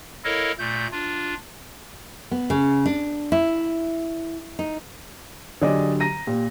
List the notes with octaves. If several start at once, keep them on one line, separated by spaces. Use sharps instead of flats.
E4 A4 A#4 C#5 D#5 F5
A#2 A3 G6
D4 F4
B3
C#3
D4
E4
D#4
D3 F#3 G4 G#4 D5 D#5
A#5 A#6 D#7
A#2 G4